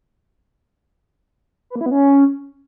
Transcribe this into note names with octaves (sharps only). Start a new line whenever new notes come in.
B4
A#3
E4
B3
C#4